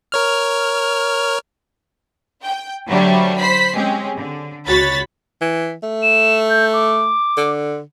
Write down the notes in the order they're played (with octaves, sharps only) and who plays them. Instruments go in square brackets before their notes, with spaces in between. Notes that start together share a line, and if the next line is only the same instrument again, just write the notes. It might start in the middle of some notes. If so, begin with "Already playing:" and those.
[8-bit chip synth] A#4 C#5 F6
[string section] G5
D3 F#3 G3 A3 C5 C#5
C5 B5 B6 C7
G#3 C4 C#4 G4 G#4
D3
C#2 F#4 C#5 B5 A6
[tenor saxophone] E3
A3
[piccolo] E7
G6
D6
[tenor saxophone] D3